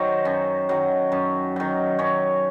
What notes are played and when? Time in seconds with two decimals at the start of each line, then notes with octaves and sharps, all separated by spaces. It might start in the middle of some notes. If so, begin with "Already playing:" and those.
Already playing: D#3 F#3 C5
0.25 F#2
0.69 D#3 F#3
1.12 F#2
1.56 D#3 F#3
1.99 F#2 C#5